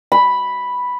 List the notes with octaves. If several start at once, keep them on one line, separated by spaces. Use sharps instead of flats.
B5